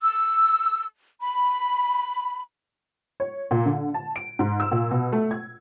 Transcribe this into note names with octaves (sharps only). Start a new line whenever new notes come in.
E6
B5
C#5
A#2
D3
A5
D7
G#2
E6
A#2
B2
A3
G#6